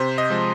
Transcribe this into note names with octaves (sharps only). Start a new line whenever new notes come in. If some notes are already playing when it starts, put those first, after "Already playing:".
Already playing: C3 C5
D#5
F3 G#3